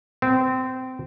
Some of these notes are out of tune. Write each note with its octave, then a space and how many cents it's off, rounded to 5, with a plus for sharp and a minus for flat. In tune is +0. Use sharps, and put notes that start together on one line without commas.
C4 -20